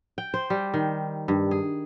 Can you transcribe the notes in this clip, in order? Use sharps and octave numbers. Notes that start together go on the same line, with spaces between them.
G5
C5
G3
D#3
G2
G#4